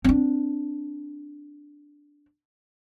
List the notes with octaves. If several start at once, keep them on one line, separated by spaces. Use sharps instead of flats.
C4 D4